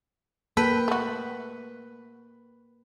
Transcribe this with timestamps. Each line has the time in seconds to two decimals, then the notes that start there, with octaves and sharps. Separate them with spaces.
0.57 A#3 A4 B4 G5
0.88 A3 F#4